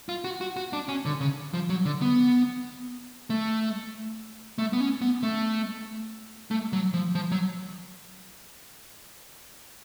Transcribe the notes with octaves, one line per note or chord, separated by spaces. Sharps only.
F4
F#4
F#4
F#4
D4
C#4
D3
C#3
F3
F#3
D3
B3
A3
A3
B3
C#4
B3
A3
A3
F#3
F3
F3
F#3